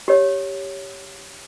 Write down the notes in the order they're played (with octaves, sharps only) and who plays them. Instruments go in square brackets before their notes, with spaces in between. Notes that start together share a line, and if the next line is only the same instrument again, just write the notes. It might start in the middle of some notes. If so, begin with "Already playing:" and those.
[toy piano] G4 C#5